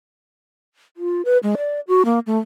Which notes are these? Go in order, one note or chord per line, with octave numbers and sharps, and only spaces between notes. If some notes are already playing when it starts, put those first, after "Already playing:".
F4
B4
G#3
D5
F#4
A#3
A3